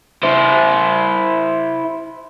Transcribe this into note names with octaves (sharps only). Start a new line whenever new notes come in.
E4 C5